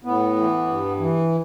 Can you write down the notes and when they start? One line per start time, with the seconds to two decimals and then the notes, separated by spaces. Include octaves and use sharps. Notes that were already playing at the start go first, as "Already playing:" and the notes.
0.04 A2 B3
0.36 E3
0.67 G2
0.99 E3